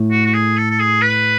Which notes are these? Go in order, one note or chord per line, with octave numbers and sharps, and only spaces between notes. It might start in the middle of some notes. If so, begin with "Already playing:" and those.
Already playing: A2
F#4
F#4
G#4
A4
A4
G#4
B4